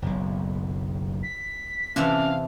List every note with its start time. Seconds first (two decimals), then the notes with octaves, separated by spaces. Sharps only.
0.02 F#1 B1
1.23 B6
1.96 C3 E3 C#4 D4 F5